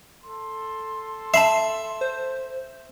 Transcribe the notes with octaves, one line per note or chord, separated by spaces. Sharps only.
A4 C6
E5 A5 B5 C7
C5